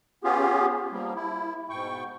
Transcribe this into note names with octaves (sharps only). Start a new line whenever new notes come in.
B3 C#4 F4 G4 G#4
F3 G3 A#3
E4
G#2 B2 G5 C#6